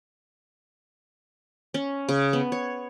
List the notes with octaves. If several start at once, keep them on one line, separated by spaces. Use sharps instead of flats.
C#4
C#3
B3
C#5